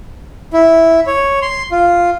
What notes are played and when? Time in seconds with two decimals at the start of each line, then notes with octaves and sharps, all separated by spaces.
0.53 E4
1.07 C#5
1.42 C6
1.71 F4